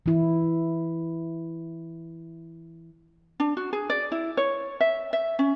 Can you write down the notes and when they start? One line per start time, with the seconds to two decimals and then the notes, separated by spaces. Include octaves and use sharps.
0.06 E3 E4
3.40 D4
3.57 F#4
3.73 G#4
3.90 D5
4.12 E4
4.37 C#5
4.80 E5
5.13 E5
5.39 C#4